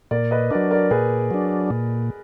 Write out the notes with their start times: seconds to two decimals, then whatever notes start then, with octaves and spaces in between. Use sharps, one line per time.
0.11 A#2 A#4 D5
0.31 B4 D#5
0.51 F#3 D4 A#4 D5
0.71 A#4 D5
0.91 A#2 G#4 B4
1.31 F#3 D4
1.70 A#2